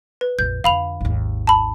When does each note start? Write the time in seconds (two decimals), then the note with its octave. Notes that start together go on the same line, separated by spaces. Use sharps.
0.21 B4
0.39 A#1 F2 G6
0.64 F2 D3 F5 B5 F7
1.01 G#1 D#2
1.47 A5 B5